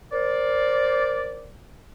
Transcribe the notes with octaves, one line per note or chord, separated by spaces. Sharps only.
A#4 C5 D5